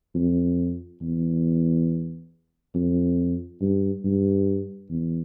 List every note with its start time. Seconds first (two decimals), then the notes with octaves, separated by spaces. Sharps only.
0.15 F2
1.02 E2
2.75 F2
3.61 G2
4.05 G2
4.90 E2